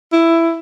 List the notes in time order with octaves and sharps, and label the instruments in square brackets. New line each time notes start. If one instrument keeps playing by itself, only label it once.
[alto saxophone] E4